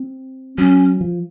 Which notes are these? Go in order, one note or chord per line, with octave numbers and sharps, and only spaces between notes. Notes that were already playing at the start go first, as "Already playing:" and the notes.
Already playing: C4
F#3 C#4
F3